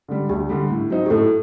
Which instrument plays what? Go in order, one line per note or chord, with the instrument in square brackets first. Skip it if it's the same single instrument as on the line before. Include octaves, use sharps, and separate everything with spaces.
[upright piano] D3 G3
[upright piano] D2 [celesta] G4
[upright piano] D3 G3
A2
F#3 C4 D#4
[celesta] G4
[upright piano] A2 [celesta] A4